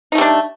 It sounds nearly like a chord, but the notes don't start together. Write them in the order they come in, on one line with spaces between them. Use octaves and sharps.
D#4 A3 G3 D4